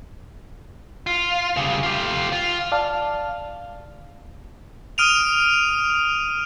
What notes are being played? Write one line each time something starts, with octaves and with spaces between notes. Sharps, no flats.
F4
C#3 G3
F4 G4
F4
D5 F5 A5
D#6 F6 D7 D#7 F7